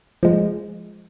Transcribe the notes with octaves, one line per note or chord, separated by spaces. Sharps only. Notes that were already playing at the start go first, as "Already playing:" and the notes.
F3 G#3